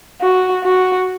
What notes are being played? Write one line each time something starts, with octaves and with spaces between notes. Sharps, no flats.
F#4
F#4